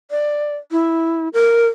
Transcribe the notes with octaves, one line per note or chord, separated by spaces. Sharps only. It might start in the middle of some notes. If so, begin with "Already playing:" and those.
D5
E4
A#4